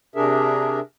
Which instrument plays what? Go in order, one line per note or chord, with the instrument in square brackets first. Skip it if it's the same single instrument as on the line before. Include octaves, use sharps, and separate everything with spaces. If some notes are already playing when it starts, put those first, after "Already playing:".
[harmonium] C3 D4 G#4 A#4 E5